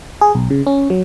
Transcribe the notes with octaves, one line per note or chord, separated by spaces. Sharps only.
G#4
B1
C#3
C#4
F#3